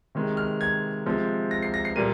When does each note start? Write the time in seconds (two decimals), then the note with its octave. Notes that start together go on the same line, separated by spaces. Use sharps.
0.15 C3 D#3 G#3
0.37 F6
0.61 G#6
1.06 C3 F3 G#3
1.51 A#6
1.62 C7
1.74 A#6
1.85 C7
1.96 A#2 G3 A#3 D#7